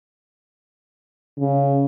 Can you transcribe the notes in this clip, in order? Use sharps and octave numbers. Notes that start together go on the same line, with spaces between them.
C#3